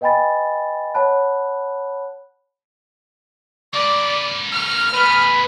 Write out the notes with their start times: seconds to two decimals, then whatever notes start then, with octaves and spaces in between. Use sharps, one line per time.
0.01 B4 D#5 G5 G#5 B5 A6
0.94 C#5 F#5 A5 B5 F#6
3.74 A#3 B4 D5
4.52 F6
4.94 A3 G#4 B4